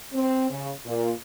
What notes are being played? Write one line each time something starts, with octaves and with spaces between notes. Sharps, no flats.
C4
C#3
A#2